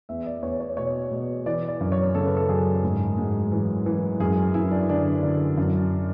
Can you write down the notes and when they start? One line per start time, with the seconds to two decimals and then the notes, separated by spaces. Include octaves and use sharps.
0.09 E2 E5
0.26 D5
0.43 E2 C#5
0.60 C#5
0.77 B2 C#5
1.11 B2
1.46 E3 D5
1.68 D5
1.81 F#2
1.92 C#5
2.15 C#3 A4
2.26 B4
2.37 A4
2.49 F#2 G#4
2.83 G#2
3.18 G#2
3.52 E3
3.86 E3
4.20 F#2 G#4
4.54 F#2 E4
4.71 D4
4.89 D3 D4
5.23 D3
5.57 F#2